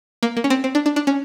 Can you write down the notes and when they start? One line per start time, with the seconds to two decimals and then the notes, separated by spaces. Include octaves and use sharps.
0.23 A#3
0.37 A#3
0.44 C#4
0.50 C4
0.64 C4
0.75 D4
0.86 D4
0.96 D4
1.07 C#4